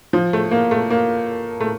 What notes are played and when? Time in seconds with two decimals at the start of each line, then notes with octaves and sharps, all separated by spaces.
0.13 F3
0.33 A3
0.51 A#3
0.71 A3
0.90 A#3
1.60 A3